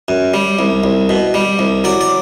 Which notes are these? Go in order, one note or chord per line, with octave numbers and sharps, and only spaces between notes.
F#2
G3
C2
C2
B2
G3
C2
F#3 D5
D5